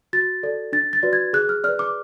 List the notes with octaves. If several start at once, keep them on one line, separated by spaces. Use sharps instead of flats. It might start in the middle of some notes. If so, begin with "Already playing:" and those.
F#4 A6
A4 D5
D4 A6
A6
F#4 B4 D5
G#6
G#4 F#6
F6
B4 D5 F6
D6